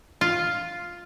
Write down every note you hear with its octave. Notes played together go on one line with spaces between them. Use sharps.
F4